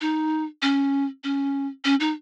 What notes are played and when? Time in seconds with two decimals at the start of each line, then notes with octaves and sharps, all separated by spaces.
0.01 D#4
0.62 C#4
1.24 C#4
1.85 C#4
2.00 D#4